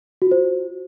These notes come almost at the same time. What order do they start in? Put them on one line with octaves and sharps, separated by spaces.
F#4 F4 C5